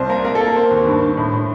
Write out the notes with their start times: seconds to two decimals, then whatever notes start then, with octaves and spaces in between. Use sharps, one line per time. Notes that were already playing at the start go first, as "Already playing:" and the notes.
Already playing: C2 C5
0.09 A#3 A#4
0.25 A#3 A#4
0.35 A4
0.41 A#3
0.46 A#4
0.56 C4 C5
0.71 D#2
0.86 G2
1.02 G2
1.17 A2
1.33 A2